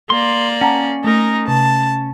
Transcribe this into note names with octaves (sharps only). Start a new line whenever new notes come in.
A#3 D5 C6
C#4 F#5 A5 A#5
A3 D#4 A#4
C3 A5